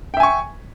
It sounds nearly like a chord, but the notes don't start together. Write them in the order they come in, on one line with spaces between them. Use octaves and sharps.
G5 E5 G#5 C#6